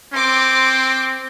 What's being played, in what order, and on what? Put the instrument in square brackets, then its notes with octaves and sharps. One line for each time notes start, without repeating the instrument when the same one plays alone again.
[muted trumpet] C4 [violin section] C6 D6